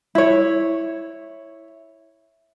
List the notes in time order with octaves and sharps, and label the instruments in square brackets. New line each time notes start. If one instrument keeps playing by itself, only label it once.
[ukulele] E4 C#5